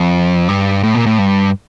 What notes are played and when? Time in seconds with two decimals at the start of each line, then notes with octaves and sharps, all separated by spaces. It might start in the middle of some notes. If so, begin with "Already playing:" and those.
Already playing: F2
0.48 G2
0.83 A2
0.95 A#2
1.06 A2
1.18 G2